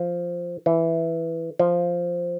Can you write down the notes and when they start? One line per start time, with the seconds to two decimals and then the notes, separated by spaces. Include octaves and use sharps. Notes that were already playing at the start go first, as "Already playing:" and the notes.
Already playing: F3
0.66 E3
1.59 F3